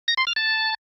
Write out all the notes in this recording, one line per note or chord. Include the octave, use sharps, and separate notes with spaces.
A#6
C6
F6
A5